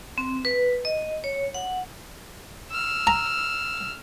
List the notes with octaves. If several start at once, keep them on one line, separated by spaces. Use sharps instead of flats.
C4
B4
D#5
C#5
F#5
E6 F6
A#5